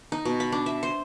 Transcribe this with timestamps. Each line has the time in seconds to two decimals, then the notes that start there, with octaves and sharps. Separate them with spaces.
0.12 D#4
0.25 B2
0.40 B5
0.52 D4
0.66 E5
0.83 C5